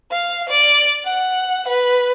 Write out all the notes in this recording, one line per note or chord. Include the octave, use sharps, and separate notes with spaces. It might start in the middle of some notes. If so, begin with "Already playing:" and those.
F5
D5
F#5
B4